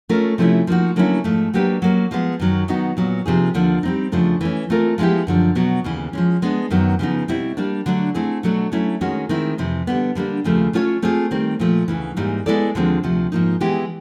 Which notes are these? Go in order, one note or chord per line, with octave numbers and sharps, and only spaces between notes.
A3 C#4 F4 A#4
C3 F3 A3 C#4 E4
F3 A#3 D#4 F#4
D3 F#3 A#3 C#4 E4
G#2 F3 A3
F#3 A#3 D4 G4 B4
F#3 A#3 C#4
F3 G#3 B3
F#2 D#3 F#3
D#3 F#3 B3 D#4 F#4
A#2 F#3 B3
C3 F3 A#3 D#4 G#4
D#2 D3 F3 A#3
G3 C4 D#4
E2 C#3 F3 A3 D4
E3 A3 C#4
E3 A3 C4 F4 A#4
F3 G#3 B3 E4 G4
F#2 D3 F3
B2 F#3 B3
D#2 C#3 E3
F3 G#3 C#4
G#3 B3 D4
F#2 D#3 F#3 B3
C#3 F3 G#3 B3 D#4
B2 G3 C4 E4
G3 A#3 D4
D3 F#3 A3 D4
A3 C4 E4 G#4
B2 F#3 A3 D4
F#3 A3 C#4 E4
D#3 G#3 C#4 F#4
D#3 G#3 C4 E4
F2 C3 E3
D3 G3 B3
D3 G3 A#3 D4
D#2 C#3 F3 A3
A3 C#4 F4 G#4 C#5
A3 C4 F4 G#4
D#3 G3 C4
A#2 F3 A3
D2 C#3 E3
G#2 E3 G3 A#3 D#4
G#3 B3 E4 A4 D5
D#2 D3 F3 G#3 C4
D2 C3 F3
G#2 F3 A#3 D#4
E3 G#3 B3 E4 G4